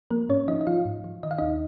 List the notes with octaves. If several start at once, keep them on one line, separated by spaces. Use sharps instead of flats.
F3 A#3 A#4
G#2 C#4 C#5
F3 D#4 D#5
D#5
F3 F4 F5
G#2
F3
D#3 D#5
F5
D#2 D#4 D#5